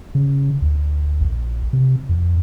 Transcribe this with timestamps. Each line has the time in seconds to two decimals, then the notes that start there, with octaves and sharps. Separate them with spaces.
0.15 C#3
0.62 D2
1.21 A#1
1.73 C3
2.09 F2